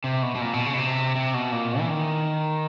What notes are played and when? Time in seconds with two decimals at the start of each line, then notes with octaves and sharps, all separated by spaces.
0.04 C3
0.23 B2
0.35 B2
0.41 A#2
0.53 B2
0.66 C#3
0.74 B2
0.78 C3
1.16 C3
1.34 B2
1.52 A#2
1.79 E3
1.90 D#3